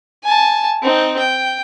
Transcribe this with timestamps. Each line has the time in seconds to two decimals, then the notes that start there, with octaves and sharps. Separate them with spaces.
0.24 G#5 A5
0.83 C4 D#4
1.19 G5